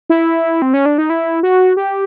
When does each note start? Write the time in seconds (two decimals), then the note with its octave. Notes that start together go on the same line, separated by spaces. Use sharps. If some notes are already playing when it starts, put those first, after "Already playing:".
0.10 E4
0.62 C4
0.74 C#4
0.86 D4
0.98 D#4
1.10 E4
1.43 F#4
1.77 G4